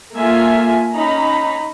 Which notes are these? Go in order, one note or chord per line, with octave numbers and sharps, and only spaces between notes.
A3 A#3 F4 E5 G#5
C#4 D#4 A#5 B5